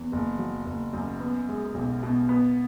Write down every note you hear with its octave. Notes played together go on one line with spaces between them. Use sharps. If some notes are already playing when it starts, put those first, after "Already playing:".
Already playing: E2
F#1
F#3
F#1
F#2
B3
G#3
B1
B2
B3